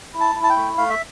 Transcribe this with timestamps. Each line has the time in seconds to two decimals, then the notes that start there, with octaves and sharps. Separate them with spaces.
0.14 E4
0.20 A5
0.35 E4
0.43 A5
0.50 G5
0.56 A3
0.77 A3 F5
0.90 E5